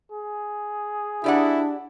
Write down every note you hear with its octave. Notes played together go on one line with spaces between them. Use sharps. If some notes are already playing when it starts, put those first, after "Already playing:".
G#4
D4 E4 G4 D5 F#5